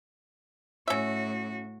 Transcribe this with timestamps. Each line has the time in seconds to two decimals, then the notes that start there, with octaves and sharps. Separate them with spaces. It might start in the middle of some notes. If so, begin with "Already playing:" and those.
0.88 A2 C#4 F#4 E5